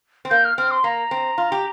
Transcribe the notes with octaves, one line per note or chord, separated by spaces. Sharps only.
C4
A#3 G6
F6
C4 F6
C6
A#3 A#5
C4
F4
G4